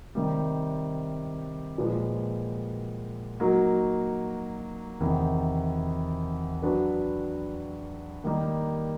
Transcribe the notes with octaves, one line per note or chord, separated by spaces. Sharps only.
C3 D#3 G3
A#2 F3 G#3 B3
F#3 A#3 D#4 F#4
E2 C3 D#3
F#3 B3 D4 F#4 B4
D#3 G3 A#3 D#4